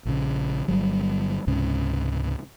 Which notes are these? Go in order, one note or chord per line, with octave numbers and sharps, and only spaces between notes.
A#1 C#3
G1 F#3 G3
C#2 G#2 C3 C#4